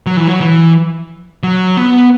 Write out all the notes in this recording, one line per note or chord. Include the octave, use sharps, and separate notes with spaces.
F#3
E3
F#3
E3
F#3
B3